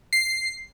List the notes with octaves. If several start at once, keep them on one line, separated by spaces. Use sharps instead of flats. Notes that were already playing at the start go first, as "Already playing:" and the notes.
C7